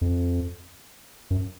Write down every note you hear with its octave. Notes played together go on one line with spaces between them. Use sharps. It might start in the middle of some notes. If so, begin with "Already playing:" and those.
F2
F#2